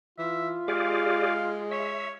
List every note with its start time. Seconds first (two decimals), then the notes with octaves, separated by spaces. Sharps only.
0.19 E3 F4 E5
0.68 G#3 G4 G#4 D5 F5
1.71 C#5 E5